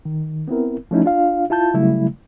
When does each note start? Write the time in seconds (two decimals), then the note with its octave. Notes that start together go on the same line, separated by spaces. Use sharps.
0.05 D#3
0.48 B3 C4 E4 A#4
0.91 F3 A3 C#4 D#4 E4
1.04 D4 F4 F5
1.50 E4 F4 A5 G6
1.74 C#3 F#3 G3 A3 E4